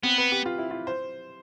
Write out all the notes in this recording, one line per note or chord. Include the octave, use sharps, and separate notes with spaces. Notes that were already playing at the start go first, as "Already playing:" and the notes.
B3 C4
B4
G4
F4
E4
F4
C5